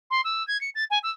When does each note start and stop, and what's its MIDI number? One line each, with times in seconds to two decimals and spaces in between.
0.10 0.21 84
0.24 0.45 88
0.47 0.60 92
0.61 0.70 97
0.75 0.84 93
0.90 0.98 80
1.03 1.10 88